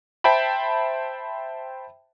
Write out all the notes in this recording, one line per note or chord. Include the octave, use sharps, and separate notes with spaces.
C5 E5 G5 A5 B5